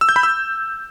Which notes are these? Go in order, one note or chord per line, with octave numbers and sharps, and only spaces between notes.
E6
G6
B5
E6